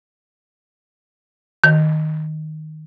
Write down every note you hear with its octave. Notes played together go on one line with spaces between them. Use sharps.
D#3